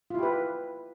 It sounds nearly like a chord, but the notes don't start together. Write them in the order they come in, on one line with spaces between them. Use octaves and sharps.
F4 E4 G4 B4